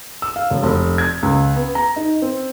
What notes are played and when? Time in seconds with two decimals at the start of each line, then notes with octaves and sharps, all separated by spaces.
0.22 E6
0.36 F5
0.50 E1
0.63 F1
0.98 G#6
1.23 C#2
1.56 B3
1.75 A#5
1.96 D#4
2.22 C4